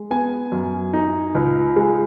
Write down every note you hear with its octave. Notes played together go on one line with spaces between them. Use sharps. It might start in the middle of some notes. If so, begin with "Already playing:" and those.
Already playing: G#3
B3 G#5
F#2
D#4
C#2
G#3